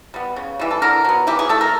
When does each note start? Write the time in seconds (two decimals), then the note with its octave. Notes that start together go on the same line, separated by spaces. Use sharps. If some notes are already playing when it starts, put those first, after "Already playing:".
0.14 G3 B3
0.36 C#3
0.59 E3 G3
0.71 A4
0.82 D3 A#4
1.05 F#3 B3
1.27 E3 G4
1.39 G#4
1.49 A3 A4
1.61 A#4